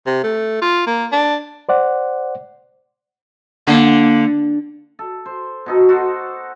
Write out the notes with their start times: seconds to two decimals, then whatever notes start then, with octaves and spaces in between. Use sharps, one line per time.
0.07 C3
0.24 A3
0.62 F4
0.87 A#3
1.12 D4
1.69 C5 D5 F#5
3.67 D3 A#3
4.99 A4
5.25 C5
5.66 B2 D#4 A4
5.89 F#4 A4 C5